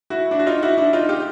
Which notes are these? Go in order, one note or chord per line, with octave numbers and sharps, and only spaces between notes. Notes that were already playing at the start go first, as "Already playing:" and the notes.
E4 F#4
D4 E4
F#4
D#4 F4
E4 F#4
D4 E4
D#4 F4
F4 G4